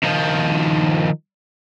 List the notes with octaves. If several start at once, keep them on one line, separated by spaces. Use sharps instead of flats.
D#3 F3